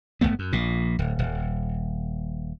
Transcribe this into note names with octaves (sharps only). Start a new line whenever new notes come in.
G1 D#2 A3 B3
F#2
A#1 A#2
D1
D#1